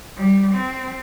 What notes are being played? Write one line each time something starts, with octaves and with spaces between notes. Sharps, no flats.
G3
C4